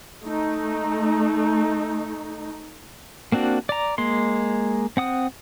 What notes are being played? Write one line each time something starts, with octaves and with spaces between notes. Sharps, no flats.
A3 D#4
A#3 C4 D4 F#4
D5 A#5
G#3 A#3 C6
C4 F#5 D#6